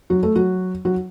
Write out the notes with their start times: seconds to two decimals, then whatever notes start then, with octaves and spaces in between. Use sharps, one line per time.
0.10 F#3 F#4
0.23 A3 A4
0.35 F#3 F#4
0.85 F#3 F#4